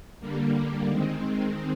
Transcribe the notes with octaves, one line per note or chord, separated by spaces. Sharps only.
D3 G3 A#3
D#3 G#3 C4